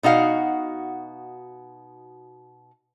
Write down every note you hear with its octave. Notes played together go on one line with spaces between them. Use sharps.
B2 D#4 F#4 F5 F#5